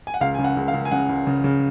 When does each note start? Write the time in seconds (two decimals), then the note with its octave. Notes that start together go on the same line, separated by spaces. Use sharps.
0.07 G#5
0.14 F#5
0.21 C#2 F5
0.35 C#3 G#5
0.44 F#5
0.57 C#2
0.68 F5
0.74 C#2
0.85 G#5
0.91 C#3 F#5
1.09 C#2
1.27 C#3
1.44 C#3